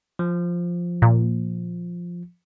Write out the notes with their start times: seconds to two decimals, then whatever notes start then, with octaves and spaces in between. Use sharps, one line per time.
0.19 F3
1.02 A#2